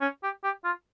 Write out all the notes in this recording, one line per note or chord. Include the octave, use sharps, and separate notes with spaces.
C#4
G4
G4
F4